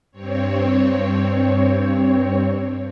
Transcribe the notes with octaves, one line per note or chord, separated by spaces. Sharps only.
G2 C4 C#5